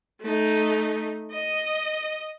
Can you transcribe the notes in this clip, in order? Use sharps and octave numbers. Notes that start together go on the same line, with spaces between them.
A3 D#4
D#5